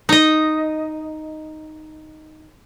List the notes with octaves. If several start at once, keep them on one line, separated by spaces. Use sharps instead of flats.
D#4 D#5